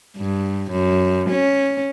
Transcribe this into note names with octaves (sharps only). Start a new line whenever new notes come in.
G2
F#2
C#4